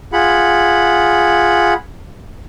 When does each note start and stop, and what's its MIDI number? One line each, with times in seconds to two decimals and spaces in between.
0.13 1.74 65
0.13 1.74 68
0.13 1.74 78
0.13 1.74 83